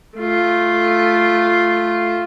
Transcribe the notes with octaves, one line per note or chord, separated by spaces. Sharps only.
A3 F4